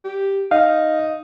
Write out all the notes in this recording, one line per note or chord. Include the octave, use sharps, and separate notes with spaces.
G4
D#4 F5